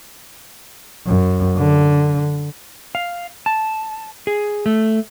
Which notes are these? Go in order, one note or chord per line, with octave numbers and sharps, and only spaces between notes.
F#2
D3
F5
A5
G#4
A3